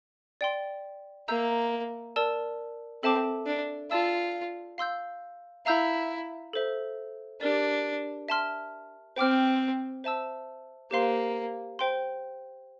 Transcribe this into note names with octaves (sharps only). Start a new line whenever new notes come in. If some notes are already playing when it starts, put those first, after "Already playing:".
D5 G5 C6
A#3 E5 A#5 E6 G6
A#4 D5 A5 E6
C4 A4 E5 A5 D6
D4
F4 D5 A5 E6
F5 C6 E6 G6
E4 F5 A#5 E6 G6
A4 C5 E5
D4 G4 A#4 D5
E5 A5 C6 F6
C4 C5 G5 D6 F6
C5 E5 A5 E6
A#3 G4 C5 F5 C6
C5 G5 C6